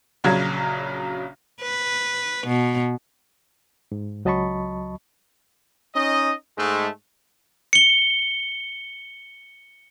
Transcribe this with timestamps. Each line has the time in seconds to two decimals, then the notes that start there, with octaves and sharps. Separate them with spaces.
0.24 A#1 C#3 F#3 G#6
1.62 B4
2.47 B2
3.92 G#2
4.25 C#2 F#3 D#5 A5 B5 C#6
5.95 C#4 D#4 D#5
6.58 G#2 G#3 A3
7.73 C#7 G7